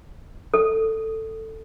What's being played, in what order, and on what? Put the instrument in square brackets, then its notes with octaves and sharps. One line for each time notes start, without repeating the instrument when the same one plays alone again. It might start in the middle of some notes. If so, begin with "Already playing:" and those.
[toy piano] A4